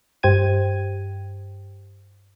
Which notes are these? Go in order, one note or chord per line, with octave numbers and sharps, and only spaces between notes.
G2 G4 C5 G5 G#6 D#7